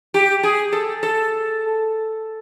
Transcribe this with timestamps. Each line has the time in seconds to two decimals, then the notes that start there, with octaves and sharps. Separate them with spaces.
0.14 G4
0.43 G#4
0.72 A4
1.03 A4